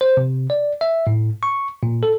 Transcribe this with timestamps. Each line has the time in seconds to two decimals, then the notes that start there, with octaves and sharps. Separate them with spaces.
0.01 C5
0.17 C3
0.50 D5
0.81 E5
1.07 A2
1.43 C#6
1.83 A#2
2.03 A4